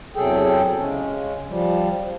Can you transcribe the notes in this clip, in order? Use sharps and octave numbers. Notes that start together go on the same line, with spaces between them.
E2 C3 F#3 G#4 A4 G5
C#3 G#3 C#4
F3 G3